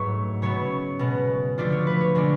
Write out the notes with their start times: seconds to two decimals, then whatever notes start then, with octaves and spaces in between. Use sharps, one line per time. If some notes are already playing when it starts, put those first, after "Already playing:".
Already playing: G#2 F#3 A3 B4 C#5
0.42 C#3 F#3 B3 C#5
0.99 B2 G#3 B3
1.58 D3 F3 A3 D4 F4 D5
1.72 C#5
1.87 B4
2.01 C#5
2.15 D3 G#3 D4 F4 D5